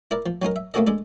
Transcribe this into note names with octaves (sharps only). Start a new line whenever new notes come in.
E4 A#4 D5
F3
F#3 C#4 D#4 A#4
E5
A3 A#3 C#4 F#4 A4 D#5
G#3 D4 A4